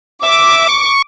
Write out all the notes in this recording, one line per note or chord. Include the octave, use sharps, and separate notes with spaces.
E5 D6
C#6